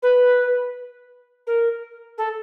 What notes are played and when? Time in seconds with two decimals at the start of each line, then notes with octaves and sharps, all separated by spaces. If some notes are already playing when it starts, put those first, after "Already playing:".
0.02 B4
1.46 A#4
2.17 A4